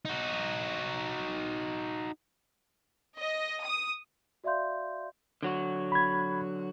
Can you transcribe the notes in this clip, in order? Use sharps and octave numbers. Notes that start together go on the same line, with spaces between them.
D#4 F#4
D#5
D#6
F#4 D5 E5 F5 C6 G6
D3 F#3 F#4
B5 G#6